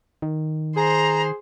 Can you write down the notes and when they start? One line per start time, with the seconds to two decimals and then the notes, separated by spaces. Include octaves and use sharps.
0.22 D#3
0.77 G#4 C5 A#5